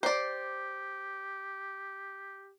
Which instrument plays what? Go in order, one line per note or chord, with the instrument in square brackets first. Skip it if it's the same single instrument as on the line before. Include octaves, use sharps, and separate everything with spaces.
[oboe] G4 [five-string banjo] C5 D5